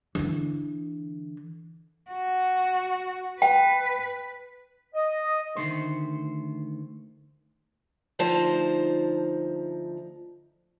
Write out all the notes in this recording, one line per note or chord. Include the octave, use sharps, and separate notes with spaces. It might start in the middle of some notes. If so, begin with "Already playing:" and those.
D3 E3
F#4
B4 G5
D#5
D2 D#3 A3 C5
D2 F3 D#4 C5 A5